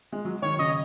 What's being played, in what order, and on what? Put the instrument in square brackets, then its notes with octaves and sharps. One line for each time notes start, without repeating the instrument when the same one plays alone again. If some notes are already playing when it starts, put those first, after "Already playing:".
[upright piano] G#3
F#3
[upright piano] D#3 [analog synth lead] C#5
[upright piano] C#3 [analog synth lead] D#5